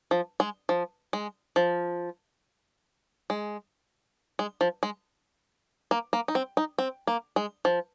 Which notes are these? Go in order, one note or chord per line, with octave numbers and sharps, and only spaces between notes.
F3
G#3
F3
G#3
F3
G#3
G#3
F3
G#3
A#3
A#3
D#4
C4
D#4
C4
A#3
G#3
F3